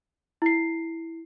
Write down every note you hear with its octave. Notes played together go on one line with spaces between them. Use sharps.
E4 C7